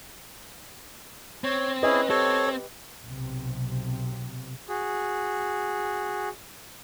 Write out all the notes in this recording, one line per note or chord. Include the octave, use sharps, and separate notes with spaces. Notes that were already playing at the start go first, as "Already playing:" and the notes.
C4 C#5
C#4 E4 G#4 B4 D#5
C4 G4 A4 C#5
B1 C3
F#4 G#4